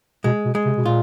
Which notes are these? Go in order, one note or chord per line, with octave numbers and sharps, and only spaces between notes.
B2 G#3
B2
G#3
C3
B2
A#2 F4